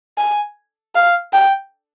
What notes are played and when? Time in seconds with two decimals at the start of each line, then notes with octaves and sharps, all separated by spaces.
0.18 G#5
0.95 F5
1.33 G5